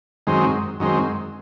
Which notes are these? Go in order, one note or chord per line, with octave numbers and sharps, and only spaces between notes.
F#2 D#3 G#3 C4
F#2 D#3 G#3 C4